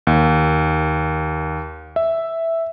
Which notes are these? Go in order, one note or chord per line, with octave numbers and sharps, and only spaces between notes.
D#2
E5